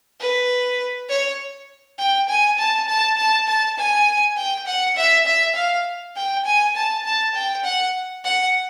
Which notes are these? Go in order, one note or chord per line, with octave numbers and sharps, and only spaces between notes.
B4
C#5
G5
G#5
A5
A5
A5
A5
G#5
G5
F#5
E5
E5
F5
G5
G#5
A5
A5
G5
F#5
F#5